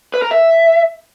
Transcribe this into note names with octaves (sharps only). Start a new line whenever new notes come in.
B4
A#4
E5